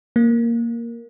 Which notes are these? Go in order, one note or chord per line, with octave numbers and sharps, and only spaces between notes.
A#3